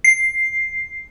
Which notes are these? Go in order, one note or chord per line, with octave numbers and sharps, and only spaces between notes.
C7